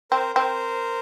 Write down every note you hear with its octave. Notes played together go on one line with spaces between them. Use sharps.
C4 A#4 C5
C4 A#4 C5